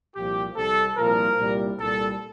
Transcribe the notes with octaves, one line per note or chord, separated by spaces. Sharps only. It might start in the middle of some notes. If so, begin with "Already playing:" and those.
C2 A#2 F3 G4
C2 C3 G3 A4
C2 A#2 F3 A#4
C2 A#2 G3
C2 A#2 G3 A4